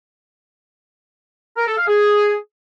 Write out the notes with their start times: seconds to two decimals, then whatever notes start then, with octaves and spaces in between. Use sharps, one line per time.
1.58 A#4
1.68 A4
1.78 F5
1.88 G#4